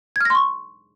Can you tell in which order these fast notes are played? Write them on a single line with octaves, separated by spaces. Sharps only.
G#6 F6 A#6 C6 C#6